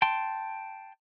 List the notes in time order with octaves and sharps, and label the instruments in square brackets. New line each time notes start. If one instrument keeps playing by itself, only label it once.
[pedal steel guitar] G5 A5 C6